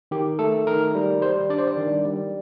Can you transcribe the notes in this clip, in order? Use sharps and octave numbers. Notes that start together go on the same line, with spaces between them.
D#3 G4
A3 A4
D#3 A#4
G3
G3 C5
D4 D5
C5
D5
D#3
G3